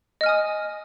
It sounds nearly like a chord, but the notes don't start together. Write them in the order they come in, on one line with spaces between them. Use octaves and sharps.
D#5 F6 G#5 D#6